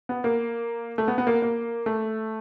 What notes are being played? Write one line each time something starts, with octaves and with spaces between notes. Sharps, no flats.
B3
A#3
A3
B3
B3
A#3
A#3
A3